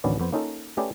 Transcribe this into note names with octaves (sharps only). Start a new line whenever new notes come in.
A1 D2 D#3 B3 C#4 D5
F2 B3 C5
A#3 C#4 D#4 F4 A4
A3 C#4 G4 G#4 B4 D5